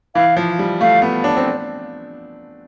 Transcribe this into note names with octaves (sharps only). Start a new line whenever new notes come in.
E3 F5
F3
G3
A3 F5
B3
D4
C4
D4